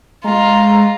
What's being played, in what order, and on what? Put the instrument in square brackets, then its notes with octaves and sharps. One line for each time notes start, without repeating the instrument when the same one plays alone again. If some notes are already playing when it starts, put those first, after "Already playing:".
[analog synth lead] G#3 [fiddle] F4 [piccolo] A#5